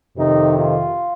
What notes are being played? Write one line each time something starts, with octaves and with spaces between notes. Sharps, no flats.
F2 C3 D#3 D#4
F4